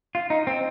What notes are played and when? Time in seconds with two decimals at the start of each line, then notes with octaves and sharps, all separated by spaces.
0.15 F4
0.30 D#4
0.47 C4